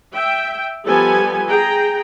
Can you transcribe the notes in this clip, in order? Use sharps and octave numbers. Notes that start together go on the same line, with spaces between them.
E5 G5
F3 G3 B3 G4 A4 G#5
G#4 G5 A#5